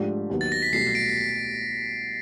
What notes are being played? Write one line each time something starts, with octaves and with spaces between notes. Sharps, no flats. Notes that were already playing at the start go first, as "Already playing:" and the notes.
Already playing: G#2 F3 A3 D4 G4
D#2 D#3 F#3 B3
A6
A#6
B6
C2 B2 F#3 A3 C7
D7